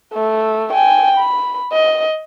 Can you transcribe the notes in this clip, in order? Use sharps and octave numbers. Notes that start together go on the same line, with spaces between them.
A3
G5 G#5
B5
D#5